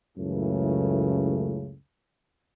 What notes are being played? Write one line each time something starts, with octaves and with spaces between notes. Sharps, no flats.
C#2 F#2 A2 C#3 E3 A3